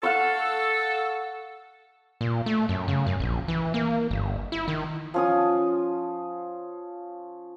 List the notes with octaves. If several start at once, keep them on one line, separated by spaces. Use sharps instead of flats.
A4 F5 F#5 C#6
A#2
A3
F#2
C#3
F#2
A#1
E3
A#3
G1
E4
D#3
F3 C#4 D#6